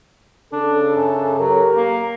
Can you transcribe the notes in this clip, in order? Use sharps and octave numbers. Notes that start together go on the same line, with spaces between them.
C#3 D4 A4
F#2
F#3 G4 A#4
A#3